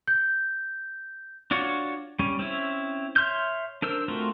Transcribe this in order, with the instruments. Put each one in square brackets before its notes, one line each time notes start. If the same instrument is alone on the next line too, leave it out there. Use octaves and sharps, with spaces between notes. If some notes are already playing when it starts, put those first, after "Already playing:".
[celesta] G6
[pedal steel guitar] D4 F4 F#4 C#5
G3 C#4
C4 C#4 E4
C#5 E5 C6 F6 G6
D4 A#4 C5 E6
A3 C4 F4 F#4 A#4